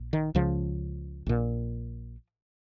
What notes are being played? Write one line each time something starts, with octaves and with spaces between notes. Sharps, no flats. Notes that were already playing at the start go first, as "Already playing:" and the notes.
Already playing: A#1
D#3
C#2 C#3 F3
A#1 A#2